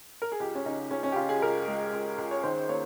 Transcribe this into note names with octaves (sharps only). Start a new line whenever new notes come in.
A#4
G#4
C#2 G4
C#4
C#3 D#4
C#2 C#4
C#4
G4
C#2 F4
G#4
C#2 A#4
G#3
C#2
C#2
C#5
D#3 C5
A#3 C#5